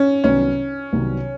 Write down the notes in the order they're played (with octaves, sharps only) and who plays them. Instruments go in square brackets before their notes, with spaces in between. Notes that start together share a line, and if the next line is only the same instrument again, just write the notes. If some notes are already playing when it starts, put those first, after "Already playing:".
Already playing: [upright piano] C#4
[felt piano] C2 C3 D#3 F#3 B3 [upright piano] C#4
[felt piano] C2 C3 D#3 F#3 B3